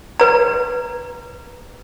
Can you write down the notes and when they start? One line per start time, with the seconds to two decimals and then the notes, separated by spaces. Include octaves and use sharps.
0.20 B4 A#5